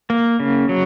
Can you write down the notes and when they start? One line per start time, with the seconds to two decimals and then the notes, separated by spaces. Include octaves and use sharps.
0.10 A#3
0.40 C#3
0.69 F#3